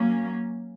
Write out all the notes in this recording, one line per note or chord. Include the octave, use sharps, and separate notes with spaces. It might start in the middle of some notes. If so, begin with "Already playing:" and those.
Already playing: F#3 A#3 C#4